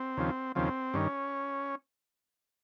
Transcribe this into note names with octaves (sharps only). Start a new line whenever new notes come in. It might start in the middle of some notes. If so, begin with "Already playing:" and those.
Already playing: C4
D#2 C#3 F3
D#2 C#3 F3 C4
G2 D#3 C#4